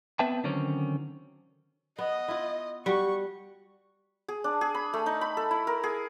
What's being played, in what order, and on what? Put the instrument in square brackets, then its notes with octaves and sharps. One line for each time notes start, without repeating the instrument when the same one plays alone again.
[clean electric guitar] B3 C4 B4 E5 G5 A5
D3 D#3 F#3 C4 C#4
[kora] B3 [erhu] D#5
[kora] E4 F4
[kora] G3 F#4 [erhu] C#6
[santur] G#4
D4
G#4
B5
A3
D#4
B5
A4
E4
A#4
G#4